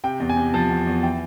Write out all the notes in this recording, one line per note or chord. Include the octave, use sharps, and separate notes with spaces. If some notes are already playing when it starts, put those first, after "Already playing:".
C3 G5
E2
G#5
C3
F3 A5
E2
E2
E3 G5